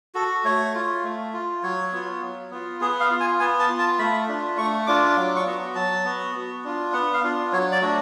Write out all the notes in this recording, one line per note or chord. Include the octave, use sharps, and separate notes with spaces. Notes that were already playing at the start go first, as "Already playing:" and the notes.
F#4 A4
A3 C#5
F4
A3
F4
F#3 C#5
B3 F4
F#3
B3 F4
B3 G#4
F5
F4
G#5
B3 G#5
A5
F4
A5
A3 B5
D4 F4
A3 C#6
D4 F4 D6
F#3 D6
C#6
B3 F#4
F#3 A5
B3 F#4
B3
D4 F4
B3 F#5
F5
D4 F4
F#3 C#5
D5
A3 D4 F#4